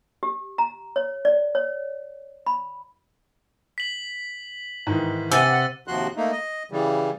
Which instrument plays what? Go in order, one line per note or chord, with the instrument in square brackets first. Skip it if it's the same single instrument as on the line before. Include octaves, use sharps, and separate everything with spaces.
[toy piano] G4
A#5
C#5
D5
C#5
B5
[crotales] B6 F#7
[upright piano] G#2 D#3 E3
[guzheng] C3 [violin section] F#5 [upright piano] G#5 [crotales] E6 A6 D#7
[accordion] D#2 C3 F3 F#4 C6 F#6
A3 A#3 D#4
D#5
C#3 E3 G3